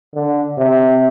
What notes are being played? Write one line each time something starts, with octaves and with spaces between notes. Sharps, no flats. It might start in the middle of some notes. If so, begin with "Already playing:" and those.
D3
C3